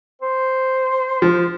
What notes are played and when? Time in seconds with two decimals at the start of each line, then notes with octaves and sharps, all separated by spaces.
0.21 C5
1.22 F3